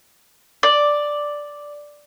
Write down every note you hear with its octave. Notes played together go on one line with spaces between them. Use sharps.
D5